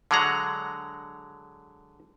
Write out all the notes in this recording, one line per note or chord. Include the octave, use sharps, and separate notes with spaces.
D3 F#3 G#3 F#5 A#5